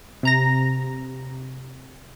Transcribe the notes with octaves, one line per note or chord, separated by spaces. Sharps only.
C3 A#5 A#6